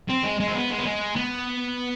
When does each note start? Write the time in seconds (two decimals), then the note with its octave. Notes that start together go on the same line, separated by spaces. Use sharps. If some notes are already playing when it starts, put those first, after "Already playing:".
0.10 C4
0.24 G#3
0.40 G#3
0.48 C4
0.55 B3
0.70 G#3
0.78 B3
0.85 G#3
1.16 B3